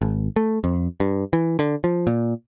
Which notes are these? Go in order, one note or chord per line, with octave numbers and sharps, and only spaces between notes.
G#1
A3
F2
G2
E3
D3
F3
A#2